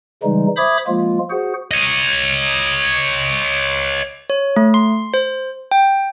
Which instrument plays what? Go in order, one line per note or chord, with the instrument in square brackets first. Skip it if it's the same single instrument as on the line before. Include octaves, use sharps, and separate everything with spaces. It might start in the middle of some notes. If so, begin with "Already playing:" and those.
[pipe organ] C#3 E3 G3 G#3 D#4
C5 E5 B5 D6 D#6 G#6
F3 G#3 A#3 F4
F#4 G#4 C5 F#5
[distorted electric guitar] C#5 D#5
[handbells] C#5
A3
C6
C5
G5